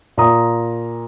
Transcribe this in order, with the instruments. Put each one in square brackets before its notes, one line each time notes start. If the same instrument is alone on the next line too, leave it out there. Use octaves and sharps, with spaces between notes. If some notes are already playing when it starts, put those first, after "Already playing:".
[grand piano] A#2 A#5 D#6